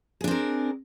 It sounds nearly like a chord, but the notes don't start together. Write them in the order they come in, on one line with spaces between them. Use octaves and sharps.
G#4 D4 C4 A#4